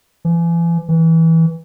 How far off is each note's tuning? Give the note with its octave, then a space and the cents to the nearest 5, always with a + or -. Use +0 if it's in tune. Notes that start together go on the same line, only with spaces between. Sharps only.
E3 +40
E3 -15